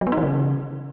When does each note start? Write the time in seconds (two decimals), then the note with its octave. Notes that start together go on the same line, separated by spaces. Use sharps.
0.01 F#3
0.07 B3
0.12 D#4
0.18 E3
0.23 C#3